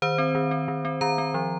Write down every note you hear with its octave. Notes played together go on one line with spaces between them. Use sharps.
D#3 C5
C4
D#3
C4
D#3
C4
D#3 A#5
C4
F3